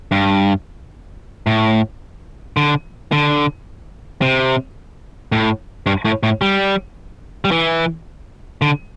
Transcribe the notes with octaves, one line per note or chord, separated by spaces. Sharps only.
G2
A2
D3
D3
C3
A2
G2
A2
A2
G3
G3
E3
D3